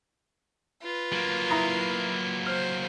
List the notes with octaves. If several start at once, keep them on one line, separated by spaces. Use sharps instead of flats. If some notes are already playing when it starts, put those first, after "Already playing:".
F4 B4
F#3 A#3
E4 A#5 D#6
C5 F6